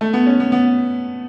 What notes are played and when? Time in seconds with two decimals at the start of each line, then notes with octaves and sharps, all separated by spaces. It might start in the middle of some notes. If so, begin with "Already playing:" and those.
0.01 A3
0.13 B3
0.27 C#4
0.40 B3
0.52 B3